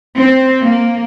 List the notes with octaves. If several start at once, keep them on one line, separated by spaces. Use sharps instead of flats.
C4
A#3